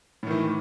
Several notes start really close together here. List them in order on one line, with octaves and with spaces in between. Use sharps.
A2 D#3 E3